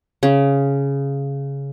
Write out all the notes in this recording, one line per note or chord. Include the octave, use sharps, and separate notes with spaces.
C#3